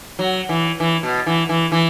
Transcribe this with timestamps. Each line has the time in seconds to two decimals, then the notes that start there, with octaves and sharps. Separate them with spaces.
0.19 F#3
0.49 E3
0.80 E3
1.03 B2
1.26 E3
1.49 E3
1.72 E3